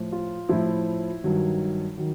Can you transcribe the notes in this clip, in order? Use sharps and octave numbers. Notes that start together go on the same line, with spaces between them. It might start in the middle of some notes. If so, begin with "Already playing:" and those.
Already playing: A2 F3
F4
A2 F3 E4
G2 D#3 F#3
D#3 F#3